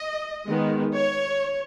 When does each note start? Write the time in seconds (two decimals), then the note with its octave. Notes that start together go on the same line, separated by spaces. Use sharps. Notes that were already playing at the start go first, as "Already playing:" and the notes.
Already playing: D#5
0.47 D#3 G#3 B3
0.94 C#5